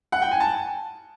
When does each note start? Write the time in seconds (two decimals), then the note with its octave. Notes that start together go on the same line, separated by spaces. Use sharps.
0.12 F#5
0.22 G5
0.31 G#5
0.40 A5